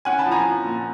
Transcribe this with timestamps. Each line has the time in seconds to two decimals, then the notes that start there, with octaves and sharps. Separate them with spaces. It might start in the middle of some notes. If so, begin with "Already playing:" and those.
0.05 C#4 F#5 G#5
0.19 A5 B5
0.25 F3
0.32 G#5 A#5
0.45 F3
0.64 A#2